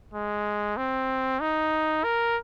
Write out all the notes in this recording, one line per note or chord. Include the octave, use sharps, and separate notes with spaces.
G#3
C4
D#4
A#4